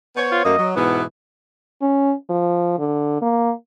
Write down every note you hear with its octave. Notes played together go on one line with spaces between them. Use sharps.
B3 C5 C#5
F4
F#2 A3 A#3 D#5
F#3
G#2 B2 E3 B3
C#4
F3
D3
A#3